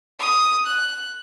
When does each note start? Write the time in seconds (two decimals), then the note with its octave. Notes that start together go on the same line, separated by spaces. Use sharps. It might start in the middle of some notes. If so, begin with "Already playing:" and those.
0.20 D#6
0.66 F#6